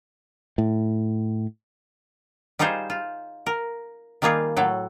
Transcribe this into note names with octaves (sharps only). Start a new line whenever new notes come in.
A2
G3 D#4 F4 G#4 C5
F4
A#4
D#3 G3 A#3 F4 G#4
A2 F#3 A4